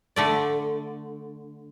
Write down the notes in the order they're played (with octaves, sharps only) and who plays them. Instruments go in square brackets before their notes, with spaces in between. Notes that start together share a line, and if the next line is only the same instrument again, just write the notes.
[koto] D3 A3 D5